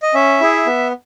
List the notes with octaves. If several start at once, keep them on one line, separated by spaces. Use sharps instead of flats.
D#5
C#4 E5
E4 G#4
B3